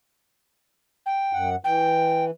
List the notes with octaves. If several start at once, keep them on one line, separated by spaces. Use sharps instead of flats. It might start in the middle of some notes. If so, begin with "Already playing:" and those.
G5
F#2 F#5
E3 G5